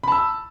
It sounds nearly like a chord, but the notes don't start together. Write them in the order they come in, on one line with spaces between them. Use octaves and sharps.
B5 A5 E6